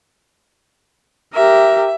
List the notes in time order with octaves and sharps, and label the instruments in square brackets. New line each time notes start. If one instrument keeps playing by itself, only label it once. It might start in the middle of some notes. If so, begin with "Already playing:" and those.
[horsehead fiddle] G4 A#4 [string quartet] E5